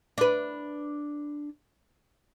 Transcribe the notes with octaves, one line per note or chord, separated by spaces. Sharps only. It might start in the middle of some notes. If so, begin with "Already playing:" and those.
D4 B4